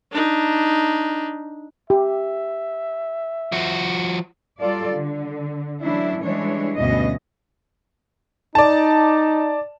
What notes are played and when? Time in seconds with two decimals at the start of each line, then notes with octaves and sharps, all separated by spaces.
0.13 D4 D#4
1.90 G4 E5
3.52 F3 F#4
4.60 F#3 G3 F4 A4 D5
4.90 D3
5.82 E3 F#3 A3 C#4 D4 E4
6.23 E3 G3 G#3 D4 C#5
6.77 D2 G2 B2 E3 C#4 D#5
8.55 D#4 D5 A5